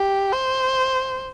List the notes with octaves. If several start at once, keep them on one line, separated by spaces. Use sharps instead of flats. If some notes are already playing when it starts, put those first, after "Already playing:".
Already playing: G4
C5